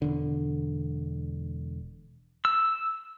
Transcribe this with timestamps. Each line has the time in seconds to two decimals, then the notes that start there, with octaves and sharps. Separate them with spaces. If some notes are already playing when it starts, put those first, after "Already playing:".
0.02 E1 D3
2.45 E6